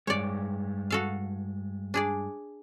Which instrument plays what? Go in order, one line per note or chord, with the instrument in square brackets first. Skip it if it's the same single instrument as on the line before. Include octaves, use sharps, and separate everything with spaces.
[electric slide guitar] G2 G#3 [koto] C#5 D5
[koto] F#4 A4 F5
D4 G#4 D5